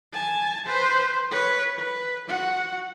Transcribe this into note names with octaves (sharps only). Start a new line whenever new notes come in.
G#5 A5
B4 C5
B4 C#5
B4
F#4 F#5